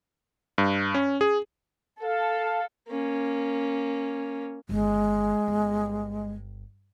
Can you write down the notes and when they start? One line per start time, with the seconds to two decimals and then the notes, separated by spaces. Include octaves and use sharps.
0.58 G2
0.94 C#4
1.21 G#4
2.02 A4 F5
2.89 A#3 C#4
4.69 G1 D#3 G#3
5.48 G1